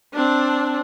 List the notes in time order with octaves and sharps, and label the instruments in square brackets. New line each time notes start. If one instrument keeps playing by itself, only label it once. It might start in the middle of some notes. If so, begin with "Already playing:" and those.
[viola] C4 D4